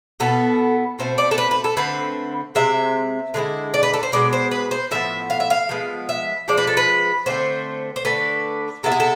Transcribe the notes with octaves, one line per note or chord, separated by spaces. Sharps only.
B2 B3 E4 A4
B2 A3 C4 C5
D5
A4
B4
B4
A4
D3 A3 C4 B4
C3 G#3 C4 E5
D3 G#3 C4 E4
D5
B4
A4
C5
B2 G#3 B3 D5
C5
B4
C5
A2 F3 B3 E5
F5
E5
F5
F3 G#3 B3
E5
F3 G#3 C4 D5
B4
A4
B4
D3 A3 C4 C5
C5
D3 A3 D4 B4
C3 G#3 B3 E4 A4
G#4
A4